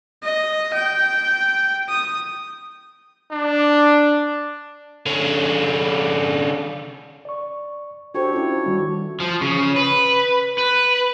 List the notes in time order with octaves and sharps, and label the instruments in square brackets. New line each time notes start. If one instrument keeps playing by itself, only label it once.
[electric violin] D#5
G5
D#6
[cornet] D4
[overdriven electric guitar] D3 C#4
[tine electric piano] D5 C#6
[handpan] D4 G4 A4 [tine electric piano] F#4 [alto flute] C5 [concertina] C#5
[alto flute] C#4 [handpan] E4 F4
[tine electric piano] D#3 G3 [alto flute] F#4
[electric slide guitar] F3
C#3
B4
B4